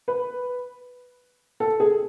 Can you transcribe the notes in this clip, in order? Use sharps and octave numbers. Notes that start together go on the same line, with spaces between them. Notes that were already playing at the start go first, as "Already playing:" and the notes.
B4
A4
G#4